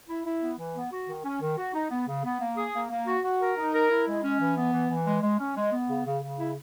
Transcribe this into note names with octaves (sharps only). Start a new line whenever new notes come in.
E4
E4
B3
E3
B3
F#4
D#3
C#4
D#3
F#4
D#4
B3
C#3
B3
A#3
G#4
A#3
A#3
F#4
F#4
A#4
D#4
A#4
E4
G#3
C#4
E3
B3
E3
E3
G#3
G#3
C#4
G#3
B3
C#3
C#3
C#3
E4